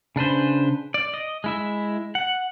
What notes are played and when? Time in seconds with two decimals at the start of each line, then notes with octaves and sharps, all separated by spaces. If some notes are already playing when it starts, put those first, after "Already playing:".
0.16 C#3 D4 B4 C5
0.94 D5
1.14 D#5
1.44 G#3 E4 E5
2.15 F#5